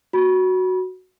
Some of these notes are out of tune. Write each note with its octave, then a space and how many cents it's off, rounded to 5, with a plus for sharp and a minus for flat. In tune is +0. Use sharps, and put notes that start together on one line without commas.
F#4 +0 B5 -25